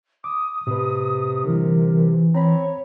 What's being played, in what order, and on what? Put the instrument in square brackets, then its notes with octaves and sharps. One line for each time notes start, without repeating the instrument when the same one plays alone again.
[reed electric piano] D6 [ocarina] D#6
[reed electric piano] A2 B4 [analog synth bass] C3
[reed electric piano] D3 G3 [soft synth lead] E3 [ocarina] A#4
[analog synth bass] C4 [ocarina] C#5 [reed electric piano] A#5 B5